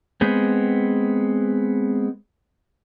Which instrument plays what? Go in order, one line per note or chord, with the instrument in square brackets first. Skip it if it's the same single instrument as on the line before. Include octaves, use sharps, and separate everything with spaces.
[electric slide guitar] G#3 B3 C4